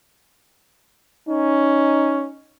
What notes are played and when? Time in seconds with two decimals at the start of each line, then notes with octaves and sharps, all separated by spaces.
1.29 C#4 D#4